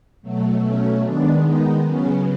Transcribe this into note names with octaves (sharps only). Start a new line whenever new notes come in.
B2 F#3 A3
C#4
D#3 G#3 B3 D4
D#4
C#3 F#3 B3 C#4